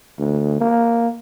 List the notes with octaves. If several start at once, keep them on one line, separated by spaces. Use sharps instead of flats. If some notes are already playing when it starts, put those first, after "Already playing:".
D2
A#3